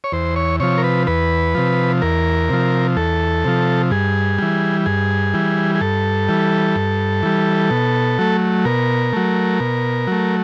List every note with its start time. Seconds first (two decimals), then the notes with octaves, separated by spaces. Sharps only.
0.04 C#5
0.12 E2 C5
0.36 C#5
0.60 C3 F3 C#5
0.78 A#4
0.84 B4
1.07 E2 B4
1.55 C3 F3
2.02 E2 A#4
2.49 C3 F3
2.97 E2 A4
3.44 C3 F3
3.91 G2 G#4
4.38 E3 G3
4.86 G2 G#4
5.34 E3 G3
5.75 G#4
5.81 G2 A4
6.29 E3 G3
6.76 G2
7.23 E3 G3
7.71 B2
8.19 F#3 A3
8.65 B2 A#4
9.13 F#3 A3
9.60 B2
10.07 F#3 A3